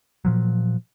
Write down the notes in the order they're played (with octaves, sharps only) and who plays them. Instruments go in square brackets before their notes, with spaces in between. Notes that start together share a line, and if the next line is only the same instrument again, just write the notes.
[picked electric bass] A#2 F3 F#3